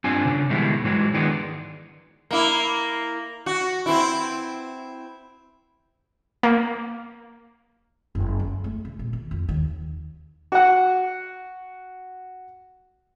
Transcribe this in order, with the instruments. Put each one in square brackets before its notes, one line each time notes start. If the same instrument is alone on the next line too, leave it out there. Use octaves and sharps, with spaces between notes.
[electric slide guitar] G2 C4 D4 F4 G#5
C#3 D4
B2 D#3 G3 G#3 E4
G#2 E3 F#3 G#3
D#3 E3 G#3 B3 D4
[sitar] A#3 E4
F#4
C4 E4
[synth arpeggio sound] A#3
[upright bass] F#1
C#4
A3
C#3
A#2
D#3
F2
D#2
[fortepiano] F#4 F#5